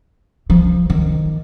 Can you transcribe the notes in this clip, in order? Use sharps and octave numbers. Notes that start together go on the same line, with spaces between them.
F3
D#3